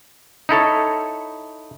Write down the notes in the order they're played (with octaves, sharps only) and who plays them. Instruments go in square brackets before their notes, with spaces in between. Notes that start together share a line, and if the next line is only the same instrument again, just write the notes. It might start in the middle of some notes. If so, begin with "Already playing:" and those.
[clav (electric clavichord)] D#4 E4 A4 C#5